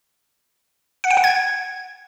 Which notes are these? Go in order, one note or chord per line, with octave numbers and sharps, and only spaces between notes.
F#5
G5
F#5
G#6